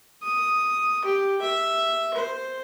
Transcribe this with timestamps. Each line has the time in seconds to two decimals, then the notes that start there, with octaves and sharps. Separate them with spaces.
0.23 D#6
1.05 G4
1.42 E5
2.14 C5